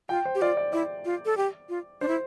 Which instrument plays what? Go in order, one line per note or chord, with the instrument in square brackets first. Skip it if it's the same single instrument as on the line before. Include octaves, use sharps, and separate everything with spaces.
[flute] F4 [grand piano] G5
[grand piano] C5
[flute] G4
[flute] F4 [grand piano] D5
[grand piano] D5
[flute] E4 [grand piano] D5
[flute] F4
A4
G4
F4
[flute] D4 [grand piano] C5
[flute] E4